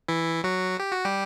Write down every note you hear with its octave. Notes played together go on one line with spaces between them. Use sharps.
E3 E4
F#3 F#4
G4
F#4
G3 G4